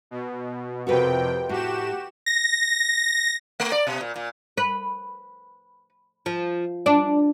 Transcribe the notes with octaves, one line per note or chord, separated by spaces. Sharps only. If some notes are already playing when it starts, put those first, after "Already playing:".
B2
F2 C3 F#4 A#4 B4 G5
A2 F#4 G4 E7
A#6
A3
D5
B2
A#2
A#2
B4
F3
D4